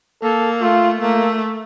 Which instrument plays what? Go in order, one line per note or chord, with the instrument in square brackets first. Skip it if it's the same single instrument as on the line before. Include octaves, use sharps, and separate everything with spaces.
[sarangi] A#3 [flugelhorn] A4
[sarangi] A3 [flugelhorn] F4
[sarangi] A3 [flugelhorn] A#3